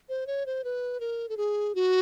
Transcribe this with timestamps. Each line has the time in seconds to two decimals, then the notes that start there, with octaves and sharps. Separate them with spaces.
0.09 C5
0.27 C#5
0.46 C5
0.64 B4
1.00 A#4
1.29 A4
1.37 G#4
1.75 F#4